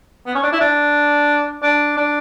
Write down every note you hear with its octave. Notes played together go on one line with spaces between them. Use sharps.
B3
C#4
D4
E4
D4
D4
D4